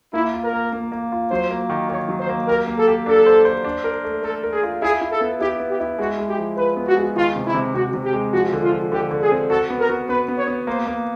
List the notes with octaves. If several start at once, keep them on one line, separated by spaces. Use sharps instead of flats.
A#3 E4
F4
A#4
A#3
A#3
A#3
F4
F#3 C5
A#3
D#3
D#3 C#5
F#3
C5
A#3
G4 A#4
A#3
A4
G4
D4 A4
C5
C5
D4
A#4
A3
A3 A4
A#4
G#4
F4
E4 G#4
E4
A4
B3
E4 G4
B3
G4
E4
G#3 F#4
G#3
G4
F3
F3 B4
B3
F#4
G#3
D#3 F4
C3
E4
C3
C3 F#4
C3
G4
G#3
F3 F#4
D3
F4
F3
D3 G4
D3
G#4
C4
F#4 A4
B3
A#4
F#4
B3 B4
B3
C#5
B3
A#3 C5
A#3